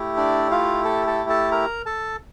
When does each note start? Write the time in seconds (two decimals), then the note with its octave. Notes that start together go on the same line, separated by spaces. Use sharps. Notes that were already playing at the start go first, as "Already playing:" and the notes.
Already playing: A3 E4 G4
0.17 D4 D5
0.51 F4 F5
0.85 A4 A5
1.07 A4 A5
1.30 A4 A5
1.52 A#4 A#5
1.86 A4 A5